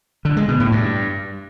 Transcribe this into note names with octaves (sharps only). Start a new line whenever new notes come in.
D3
G#3
B2
A2
G2